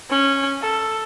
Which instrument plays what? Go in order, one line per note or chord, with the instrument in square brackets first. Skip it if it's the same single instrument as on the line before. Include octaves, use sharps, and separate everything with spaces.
[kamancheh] C#4
A4